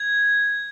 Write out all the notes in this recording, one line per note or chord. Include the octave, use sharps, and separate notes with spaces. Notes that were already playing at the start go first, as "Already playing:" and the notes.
Already playing: G#6